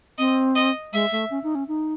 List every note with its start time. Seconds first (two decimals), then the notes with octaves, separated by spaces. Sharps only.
0.18 C4 D#5
0.56 D#5
0.93 G#3 E5
1.12 A3
1.30 C#4
1.43 D#4
1.55 C#4
1.68 D#4